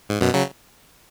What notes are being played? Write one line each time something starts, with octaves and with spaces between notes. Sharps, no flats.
G#2
F#2 B2
C#3 F#3